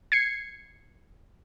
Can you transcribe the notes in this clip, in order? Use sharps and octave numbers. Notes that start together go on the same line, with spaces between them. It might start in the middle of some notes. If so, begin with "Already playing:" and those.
G#6 C7 C#7